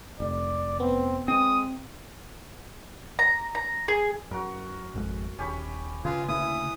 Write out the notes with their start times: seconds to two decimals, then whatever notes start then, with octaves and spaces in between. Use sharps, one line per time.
0.20 F1 D5
0.80 B3 C4
1.28 G#3 C4 D#6
3.19 A#5
3.55 A#5
3.88 G#4
4.31 F#2 F#4 A#4
4.94 G#1 F2 G#3
5.39 D#1 C#4 G4 B5
6.05 C#3 F4 B4 D#5 G#5
6.28 D2 C#3 A#3 E4 D#6